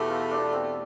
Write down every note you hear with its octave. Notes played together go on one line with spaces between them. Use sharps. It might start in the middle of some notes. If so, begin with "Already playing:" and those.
Already playing: E2 B2 A3 G4 A4
F4
D4
C4